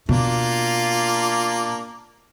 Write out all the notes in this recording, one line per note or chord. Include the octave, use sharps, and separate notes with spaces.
B2 A#3 D4 F4